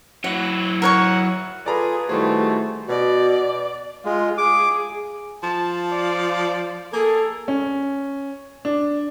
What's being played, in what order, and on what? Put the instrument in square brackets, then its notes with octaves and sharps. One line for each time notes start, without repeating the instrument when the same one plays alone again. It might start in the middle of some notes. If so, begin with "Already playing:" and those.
[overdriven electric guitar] F#3 E4 [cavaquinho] F#5
[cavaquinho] A#4 C#5 C#6 [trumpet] F#5
[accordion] F4 A4 [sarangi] G#4 [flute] B4 [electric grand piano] D5 A#5 B5
[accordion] D#3 F#4 C5 [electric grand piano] G3 E4 G#4 [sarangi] A3
[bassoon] B2 [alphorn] F#4 [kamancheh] D5
[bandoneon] G#3 [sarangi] F4
[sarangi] G#4 [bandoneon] D6
[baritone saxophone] F3 [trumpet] A5
[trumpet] D5
[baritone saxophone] A#3 [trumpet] G#4 [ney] A4
[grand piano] C#4
D4